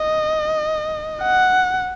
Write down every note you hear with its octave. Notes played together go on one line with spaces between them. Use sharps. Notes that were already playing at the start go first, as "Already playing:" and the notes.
Already playing: D#5
F#5